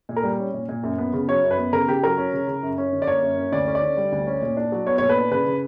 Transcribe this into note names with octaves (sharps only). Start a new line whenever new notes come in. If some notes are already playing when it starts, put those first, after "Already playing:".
A#2
A#4
G3
C#4
A#2
A#2
F#2
B3
C#3
F#3 C#5
F#2
B4
B3
C#3 A#4
C#3 G4
F#3 A#4
C#4
C#3
C#3
F#2
C#4
D3
D5
A#3 C#5
F#2
C#4
D2 D5
C#4
D5
D3
G3
D2
C#4
A#2
D4
F#3
B3 C#5
A#2 C#5
B4
D4
C#3 B4
C#3